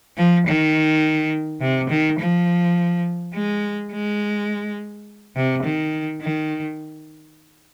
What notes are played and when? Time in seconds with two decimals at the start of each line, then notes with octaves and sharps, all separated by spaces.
0.17 F3
0.47 D#3
1.61 C3
1.90 D#3
2.19 F3
3.34 G#3
3.92 G#3
5.36 C3
5.64 D#3
6.22 D#3